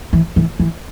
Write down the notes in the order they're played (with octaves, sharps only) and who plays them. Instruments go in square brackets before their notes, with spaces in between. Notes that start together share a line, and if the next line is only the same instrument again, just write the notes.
[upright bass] E3
E3
E3